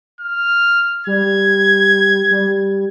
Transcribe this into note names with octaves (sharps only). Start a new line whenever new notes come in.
F6
G3 G#6
G3